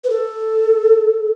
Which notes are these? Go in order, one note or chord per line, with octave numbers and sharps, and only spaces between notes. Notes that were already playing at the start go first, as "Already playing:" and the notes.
B4
A4